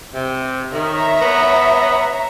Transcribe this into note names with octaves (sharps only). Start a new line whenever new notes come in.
C3
D#3 C#5 E5 A#5
B3